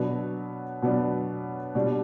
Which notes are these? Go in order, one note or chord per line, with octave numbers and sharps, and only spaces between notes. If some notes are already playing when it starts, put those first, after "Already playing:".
Already playing: B2 F#3 B3 D4
B2 F#3 B3 D4
B2 G3 D4